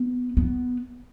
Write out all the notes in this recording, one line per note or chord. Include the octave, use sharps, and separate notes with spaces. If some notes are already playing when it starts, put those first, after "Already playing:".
Already playing: B3
B3